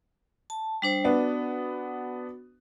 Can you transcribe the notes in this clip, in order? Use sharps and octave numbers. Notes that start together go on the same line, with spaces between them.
A5
G3 D4 C5
B3 D4 F#4